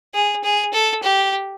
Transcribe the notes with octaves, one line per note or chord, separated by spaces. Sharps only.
G#4
G#4
A4
G4